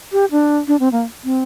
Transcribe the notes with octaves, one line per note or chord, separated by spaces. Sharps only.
G4
D4
D4
C4
A#3
C4